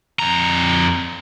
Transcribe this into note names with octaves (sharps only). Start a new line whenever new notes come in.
F2 A#5